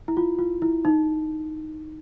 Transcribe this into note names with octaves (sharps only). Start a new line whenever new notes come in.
E4
F4
F4
E4
D#4